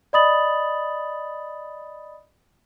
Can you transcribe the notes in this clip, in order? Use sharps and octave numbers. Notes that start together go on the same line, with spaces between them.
D5 D#5 B5 D#6 A6 F#7